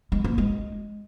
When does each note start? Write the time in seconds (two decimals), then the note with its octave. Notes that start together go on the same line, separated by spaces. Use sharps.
0.12 G#3
0.24 A#3
0.38 G#3